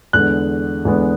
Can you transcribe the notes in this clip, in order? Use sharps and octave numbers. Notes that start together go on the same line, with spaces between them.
E2 D3 G#3 B3 F#6
E2 D3 G#3 B3